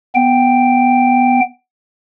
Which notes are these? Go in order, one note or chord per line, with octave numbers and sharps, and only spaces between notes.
B3 G5